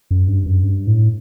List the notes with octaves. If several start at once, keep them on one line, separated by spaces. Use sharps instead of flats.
F#2
G2
F#2
G2
A2